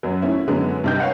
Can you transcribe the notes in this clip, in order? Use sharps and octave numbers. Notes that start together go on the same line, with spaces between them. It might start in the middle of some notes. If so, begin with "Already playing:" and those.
F#2 F#3
D#3 A3 C#4 E4
F#2 D3 F#3 G#3 B3
G2 C3 D#4 G5 G6
B4 C#5 F5 F#5